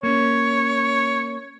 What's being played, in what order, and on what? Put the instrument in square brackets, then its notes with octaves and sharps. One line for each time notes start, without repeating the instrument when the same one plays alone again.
[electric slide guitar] A#3 C#4 [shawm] C#5